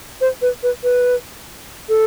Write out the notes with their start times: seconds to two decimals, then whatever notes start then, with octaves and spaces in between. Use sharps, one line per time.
0.21 C5
0.42 B4
0.63 B4
0.84 B4
1.89 A4